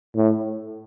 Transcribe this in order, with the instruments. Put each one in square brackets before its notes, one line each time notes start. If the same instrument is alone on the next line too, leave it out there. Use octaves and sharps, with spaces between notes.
[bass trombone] A2